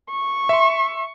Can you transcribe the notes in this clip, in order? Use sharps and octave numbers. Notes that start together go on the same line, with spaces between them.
C#6
E5 C6